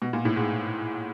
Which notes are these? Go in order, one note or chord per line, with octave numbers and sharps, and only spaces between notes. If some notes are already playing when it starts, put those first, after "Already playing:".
B2
A#2
A2
G#2